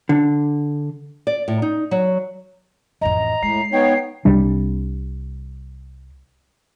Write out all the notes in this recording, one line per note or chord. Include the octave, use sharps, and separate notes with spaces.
D3
D5
A2
D#4
F#3
A1 F2 D#5 A#5
A2 G#3 C7
B3 D#4 C#5 G5
C2 C3 G3 D4